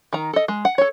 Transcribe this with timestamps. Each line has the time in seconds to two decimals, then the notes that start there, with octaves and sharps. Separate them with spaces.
0.13 D#3 A#5
0.33 A4 D#5
0.48 G#3
0.65 F#5
0.78 A4 C#5